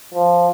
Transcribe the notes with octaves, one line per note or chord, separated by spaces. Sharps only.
F3